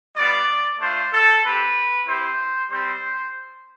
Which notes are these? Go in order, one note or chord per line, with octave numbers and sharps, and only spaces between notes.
G3 B3 F4 D5
A3 D4 F4 C5
A4
C4 G4 B4
C4 E4 G4 C5
G3 C4 G4 C5